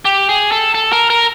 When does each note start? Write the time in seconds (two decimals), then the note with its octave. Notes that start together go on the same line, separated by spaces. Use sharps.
0.05 G4
0.29 G#4
0.52 A4
0.75 A4
0.92 A#4
1.10 A#4